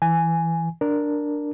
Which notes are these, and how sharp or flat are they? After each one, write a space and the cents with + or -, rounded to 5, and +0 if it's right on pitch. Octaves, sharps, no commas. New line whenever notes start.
E3 +0 G#5 +0
D4 +0 A#4 +0